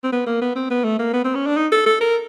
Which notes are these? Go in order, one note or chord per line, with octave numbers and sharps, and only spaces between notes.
C4
B3
A#3
B3
C4
B3
A3
A#3
B3
C4
C#4
D4
D#4
A4
A4
A#4